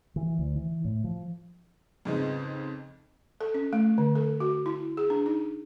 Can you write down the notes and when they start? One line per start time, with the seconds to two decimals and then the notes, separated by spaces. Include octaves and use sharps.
0.16 E3
0.38 D2
0.56 E3
0.85 A2
1.04 F3
2.05 F2 G#2 C#3 F3 G#3 B3
3.41 A4
3.54 C#4
3.73 A3
3.98 D3
4.15 A4
4.40 F#4
4.66 E4
4.97 G#4
5.10 D4
5.26 D#4